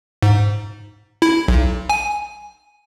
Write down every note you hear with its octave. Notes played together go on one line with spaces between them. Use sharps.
G#2
E4
B1
G#5